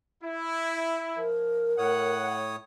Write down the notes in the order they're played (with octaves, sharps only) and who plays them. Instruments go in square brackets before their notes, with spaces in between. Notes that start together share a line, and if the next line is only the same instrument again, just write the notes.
[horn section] E4
[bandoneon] F3 [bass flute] A#4
[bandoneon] A2 C#5 D#6 [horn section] F#5